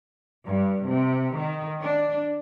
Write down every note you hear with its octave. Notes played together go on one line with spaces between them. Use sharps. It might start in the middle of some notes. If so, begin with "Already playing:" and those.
G2
C3
D#3
D4